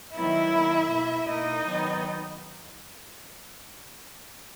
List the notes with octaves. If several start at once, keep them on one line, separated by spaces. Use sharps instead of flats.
D#3 F#3 B3 E4 E5
D#3 A#3
B2 A#3
B2 A#3 D#4 D#5
D#3 F#3 B3